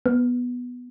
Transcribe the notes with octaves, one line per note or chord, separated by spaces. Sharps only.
B3